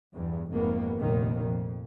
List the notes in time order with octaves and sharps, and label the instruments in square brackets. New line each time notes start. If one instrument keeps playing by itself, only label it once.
[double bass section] E2 G2
F1 G#2 D#3 A#3 B3
F1 A#1 D#2 A#2 D#3
F2